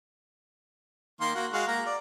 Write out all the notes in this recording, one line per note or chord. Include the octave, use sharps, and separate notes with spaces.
D#3 A#3 C6
A#3 F#4
G#3 F#4 F5
A#3 A#5
D5